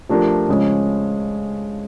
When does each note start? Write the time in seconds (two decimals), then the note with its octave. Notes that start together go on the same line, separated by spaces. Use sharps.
0.09 F3 A3 D4 G4 A#4
0.49 C#3 F3 G#3 C#4